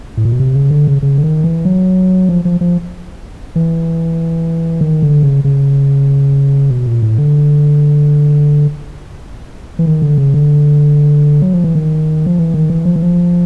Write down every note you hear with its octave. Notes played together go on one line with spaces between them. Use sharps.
A2
A#2
B2
C3
C#3
D3
C#3
C#3
D3
D#3
E3
F#3
F3
F3
F3
E3
D#3
D3
C#3
C#3
B2
A#2
A2
D3
E3
D#3
D3
C#3
D3
F#3
F3
E3
D#3
F3
E3
D#3
E3
F3
E3
F3